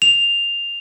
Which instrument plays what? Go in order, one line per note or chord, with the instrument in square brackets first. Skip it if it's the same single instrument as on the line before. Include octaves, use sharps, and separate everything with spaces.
[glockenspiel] F7